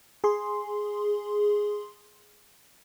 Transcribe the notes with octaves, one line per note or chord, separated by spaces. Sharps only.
G#4 C6